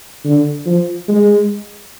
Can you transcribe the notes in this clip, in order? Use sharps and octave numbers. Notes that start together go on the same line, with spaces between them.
D3
F3
G#3